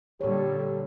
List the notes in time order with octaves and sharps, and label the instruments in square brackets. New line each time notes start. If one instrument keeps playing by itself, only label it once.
[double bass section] A#2 D3 G3 [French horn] G4 [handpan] A4 C#5